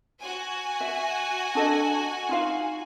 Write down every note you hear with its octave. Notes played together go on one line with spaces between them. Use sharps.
F#4 G#5
E5
D4 A4 D#5
D#4 F4 F5